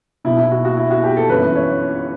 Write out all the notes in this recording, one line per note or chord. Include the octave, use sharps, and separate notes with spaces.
B1 B2 E4
E4
F#4
F#4
E4
F#4
G4
A4
G1 F#2 E3 B4
C#5